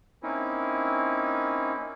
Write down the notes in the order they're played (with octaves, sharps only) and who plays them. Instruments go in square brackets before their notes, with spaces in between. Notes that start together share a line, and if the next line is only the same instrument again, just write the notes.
[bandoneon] A#3 C4 C#4 D#4 E4